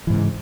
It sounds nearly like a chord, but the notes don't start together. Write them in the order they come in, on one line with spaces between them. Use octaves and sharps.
E3 G#2 C#3